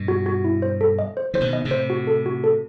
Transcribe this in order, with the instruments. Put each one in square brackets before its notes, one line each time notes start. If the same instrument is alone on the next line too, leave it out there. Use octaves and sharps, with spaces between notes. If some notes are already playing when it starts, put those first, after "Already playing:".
Already playing: [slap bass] G2 B2
[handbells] F#4
F#4
E4
C5
A4
D#5
C5
[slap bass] E3 [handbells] C5
[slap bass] B2 D#3
[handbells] D#5
[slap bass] A2 C3
[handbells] C5
F#4
A4
F#4
A4